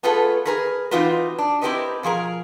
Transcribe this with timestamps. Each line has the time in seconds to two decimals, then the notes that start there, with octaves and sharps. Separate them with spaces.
0.03 A3 B3 F4 G#4 A4 B4
0.45 G#4 A#4 B4
0.91 E3 C4 D#4 F4 F#4 B4
1.39 D4
1.62 C4 E4 G4 A#4 B4 D#5
2.03 B2 F3 G#4 A#4